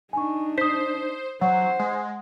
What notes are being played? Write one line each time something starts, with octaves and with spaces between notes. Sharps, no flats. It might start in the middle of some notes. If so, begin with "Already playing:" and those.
D4 D#4 G#5 C#6
C5 D#6 B6
F#3 C5 F#5
G#3